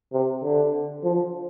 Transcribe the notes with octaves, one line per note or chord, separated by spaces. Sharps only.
C3
D3
F3